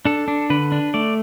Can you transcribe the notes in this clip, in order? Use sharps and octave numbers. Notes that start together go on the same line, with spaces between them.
D4 A4
D4
D3 B4
D4
A3 D5